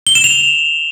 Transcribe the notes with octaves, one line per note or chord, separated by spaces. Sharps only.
G7
E7
F7